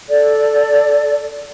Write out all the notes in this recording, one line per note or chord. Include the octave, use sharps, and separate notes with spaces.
A4 D5